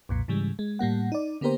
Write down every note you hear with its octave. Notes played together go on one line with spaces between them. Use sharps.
B1 F2 A#2
G#2 C#3 E3 G3 G#3
G#3
A2 G3 A#3 F#5
D#4 D5
D3 A#3 B3 G4 A#4 C5